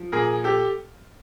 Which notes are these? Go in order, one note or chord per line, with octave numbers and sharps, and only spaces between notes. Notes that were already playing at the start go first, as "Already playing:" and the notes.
Already playing: F3
A#2 G#4 A#4
G4 A4